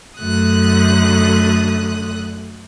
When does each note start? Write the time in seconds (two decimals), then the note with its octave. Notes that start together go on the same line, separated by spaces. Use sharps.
0.19 F#2 D3 A3 D#6 F#6